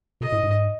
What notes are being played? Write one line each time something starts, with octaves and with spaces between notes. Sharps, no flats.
B2 D#5
A2
G#2